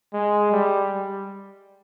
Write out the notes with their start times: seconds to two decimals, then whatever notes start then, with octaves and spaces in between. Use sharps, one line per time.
0.13 G#3
0.52 G3